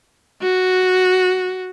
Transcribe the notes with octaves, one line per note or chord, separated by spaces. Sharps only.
F#4